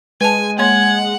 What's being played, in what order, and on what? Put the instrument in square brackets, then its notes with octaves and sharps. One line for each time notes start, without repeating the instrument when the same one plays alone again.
[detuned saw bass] G#3 [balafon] B4 A5 [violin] G#5
[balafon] A#3 C#5 C6 [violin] F#5 [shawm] G#5